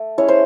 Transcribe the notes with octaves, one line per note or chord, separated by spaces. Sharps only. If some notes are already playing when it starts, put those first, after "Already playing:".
Already playing: A3
G#3 C#4 E4 C#5
C5